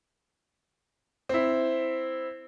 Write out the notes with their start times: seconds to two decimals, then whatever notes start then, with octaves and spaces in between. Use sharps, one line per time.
1.29 C4 E4